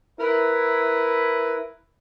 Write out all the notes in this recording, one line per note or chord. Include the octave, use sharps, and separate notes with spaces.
E4 A#4 B4